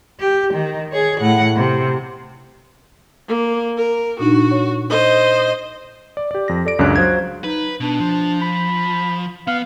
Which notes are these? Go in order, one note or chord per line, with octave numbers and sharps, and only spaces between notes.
G4
D#3
G#4 C#5
A2 F#5
C3
A#3
A#4
A#2 D4 D#4 F#4
C#5
C5 D#5
D5
G4 D5
F2 A#6
A4 D5 D7
C#2 F#2 C#4 D4 G#4 F#6
F#3 C5 F5 G#6
D#4 B4
B2 D4
F3
B5
B3 F5